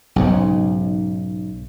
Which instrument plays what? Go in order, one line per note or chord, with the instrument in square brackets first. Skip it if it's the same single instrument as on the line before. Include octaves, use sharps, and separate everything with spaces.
[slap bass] B1 G#2 C#3